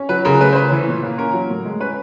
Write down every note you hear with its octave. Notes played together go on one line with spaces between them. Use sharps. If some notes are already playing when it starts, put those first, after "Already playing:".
Already playing: C#4
F#3 B4
C#3 A#4
A3 B4
C5
C#4 B4
E3
A#2
A#3
C#4 A#4
F#3
A2
G#3
C#4 B4